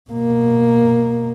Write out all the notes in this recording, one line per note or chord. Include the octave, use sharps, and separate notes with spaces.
B2 A#3